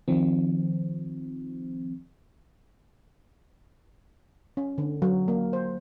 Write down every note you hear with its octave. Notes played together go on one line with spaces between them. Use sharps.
D#3 F3 C4
C#4
D3
F#3
A#3
C5